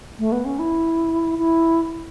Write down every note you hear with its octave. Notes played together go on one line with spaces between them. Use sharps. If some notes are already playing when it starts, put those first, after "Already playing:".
A3
B3
C#4
E4
E4